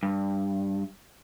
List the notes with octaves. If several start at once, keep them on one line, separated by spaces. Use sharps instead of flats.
G2